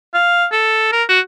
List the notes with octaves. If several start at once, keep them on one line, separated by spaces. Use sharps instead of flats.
F5
A4
A#4
F#4